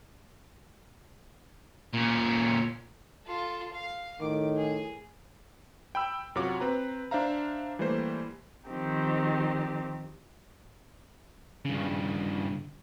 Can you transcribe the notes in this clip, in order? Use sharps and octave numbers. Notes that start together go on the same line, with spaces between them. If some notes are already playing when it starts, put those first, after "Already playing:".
A#2 C#4
F4 A4
F5
A2 D#3 D6
G#4
G5 B5 E6
F#2 C3 F4 F#4 C#5 D6
C4 B4 A#5
D4 C5 E5 F5 A#5
E3 G3 A3 A#3 C5
D#3 F3 C4 D#4 G4
G2 C#3